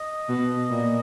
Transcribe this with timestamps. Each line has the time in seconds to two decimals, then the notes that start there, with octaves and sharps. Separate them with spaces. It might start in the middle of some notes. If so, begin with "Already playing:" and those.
Already playing: D#5
0.28 B2
0.69 A#2